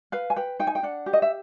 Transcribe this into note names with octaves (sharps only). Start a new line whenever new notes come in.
B4 F5
G#5
B4 G5
D#4 G5
G#5
G5
D4 F#5
G4
D#5
E5